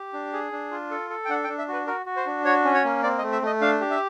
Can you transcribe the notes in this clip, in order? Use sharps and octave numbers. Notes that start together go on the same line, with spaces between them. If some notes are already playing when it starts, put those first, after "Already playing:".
Already playing: G4
D4
G#4
D4
F4
A4
A4
G5
D4 F#5
G5
D4
E5
F#4 B4
F#4 A#4
F#4
C5
D4
F#4 C#5
C#4
C#5
A#3
C4 D5
D#5
A3
E5
A3 D#5
D4 F5
G4
E5